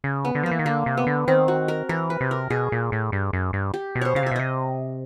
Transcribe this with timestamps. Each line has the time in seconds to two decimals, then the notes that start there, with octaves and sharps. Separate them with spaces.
0.04 C#3
0.25 B3
0.35 D3
0.43 F3
0.46 A#3
0.51 E3
0.59 D#3
0.66 D3 A#3
0.86 C3
0.97 B3
1.07 D3
1.28 D#3 C4
1.48 F#4
1.68 A#4
1.89 E3 A#4
2.10 B4
2.21 C3
2.31 A#4
2.50 B2 G#4
2.72 A#2
2.92 A2
3.12 G2
3.33 F#2
3.53 G2
3.74 G4
3.95 B2
4.01 C5 C#5
4.15 C#3 F5
4.23 C3
4.26 B2 E5
4.36 C3 D#5